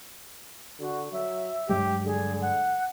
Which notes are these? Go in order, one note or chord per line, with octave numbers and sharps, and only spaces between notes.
D3 F#4
F#3 E5
G2 F#3 G#3 G4
D3 G#4
F#5